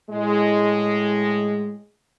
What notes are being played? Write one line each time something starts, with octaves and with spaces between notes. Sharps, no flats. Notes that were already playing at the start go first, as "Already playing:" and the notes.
A2 G#3